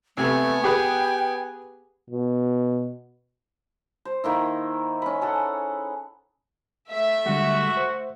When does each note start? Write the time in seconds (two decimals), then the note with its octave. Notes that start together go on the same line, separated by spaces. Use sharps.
0.17 C3 A3 B3 G#5
0.64 G4 G#4 B4 G5
2.10 B2
4.05 C5
4.24 D#3 A#3 E4
5.02 C#4 B5
5.21 G#4 A4 F#5
6.90 A3 E5
7.26 D3 G3 G#3 F#4
7.77 C5